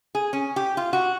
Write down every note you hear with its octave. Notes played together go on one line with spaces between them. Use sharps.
G#4
C#4
G4
F4
F#4